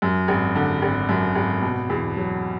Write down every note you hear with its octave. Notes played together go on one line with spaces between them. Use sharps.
F#2
G#1
D3
G#1
F#2
G#1
B2
E2
F#3